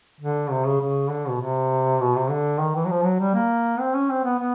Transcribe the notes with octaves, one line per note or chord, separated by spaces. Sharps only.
D3
C3
C#3
C#3
D3
B2
C3
B2
C3
D3
D#3
E3
F#3
F3
F#3
G3
A#3
C4
C#4
C4
B3
B3